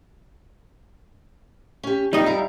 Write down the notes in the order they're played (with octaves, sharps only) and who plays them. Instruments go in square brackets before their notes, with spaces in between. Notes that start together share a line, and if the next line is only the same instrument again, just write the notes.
[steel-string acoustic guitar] C#4 G4
[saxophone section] F2 D#4 [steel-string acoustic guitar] D#3 [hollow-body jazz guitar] G3 D#5
[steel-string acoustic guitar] E4 F5 A#5